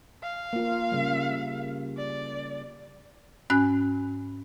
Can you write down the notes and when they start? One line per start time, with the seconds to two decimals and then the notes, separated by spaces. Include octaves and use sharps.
0.23 F5
0.53 A#3 F4
0.92 C#3 G3
1.97 D5
3.50 G#2 C#4 G#5 F#6